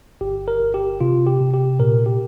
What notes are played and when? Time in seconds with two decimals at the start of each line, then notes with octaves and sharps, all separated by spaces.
0.21 G1 G4
0.48 A#4
0.60 G1
0.74 G4
1.01 C3 F4
1.27 G4
1.40 C3
1.54 G4
1.79 A#2 A#4
2.06 G4